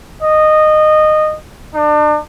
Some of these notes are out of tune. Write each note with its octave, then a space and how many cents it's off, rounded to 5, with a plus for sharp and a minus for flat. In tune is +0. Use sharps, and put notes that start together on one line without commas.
D#5 -15
D4 +35